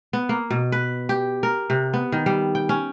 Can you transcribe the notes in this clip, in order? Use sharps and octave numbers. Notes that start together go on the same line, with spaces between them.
B3
A#3
B2
B4
G4
A#4
C3
B3
D#3
G3
G5
C#4